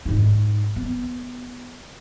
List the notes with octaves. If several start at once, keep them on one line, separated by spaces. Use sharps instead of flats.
G#2 D#4
B3